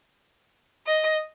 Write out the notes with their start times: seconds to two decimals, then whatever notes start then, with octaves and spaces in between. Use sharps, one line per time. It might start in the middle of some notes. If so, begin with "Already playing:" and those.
0.87 D#5